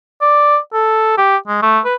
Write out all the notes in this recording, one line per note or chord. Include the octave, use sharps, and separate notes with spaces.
D5
A4
G4
G#3
A3
B4